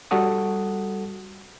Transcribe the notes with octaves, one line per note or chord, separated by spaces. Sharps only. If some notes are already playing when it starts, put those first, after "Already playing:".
G3 F#4 A4 F#5 D#6